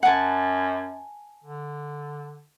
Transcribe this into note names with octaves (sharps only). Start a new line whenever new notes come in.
F#2 F#5 G#5 A5
D3